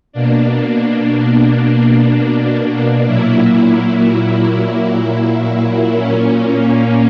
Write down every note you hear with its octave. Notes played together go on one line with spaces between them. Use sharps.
B2 A#3 D4
A#2 F#3 A#3 E4
A#2 A#3 C#4